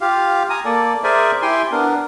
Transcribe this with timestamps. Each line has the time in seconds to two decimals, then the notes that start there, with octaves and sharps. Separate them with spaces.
0.01 F4 G4 F5
0.50 G#5 A#5 D#6
0.65 A#3 A4 D5
1.04 G#4 A#4 C5 D5 E5 G#5
1.42 E4 G4 G5 G#5 C6
1.72 B3 D4 A#4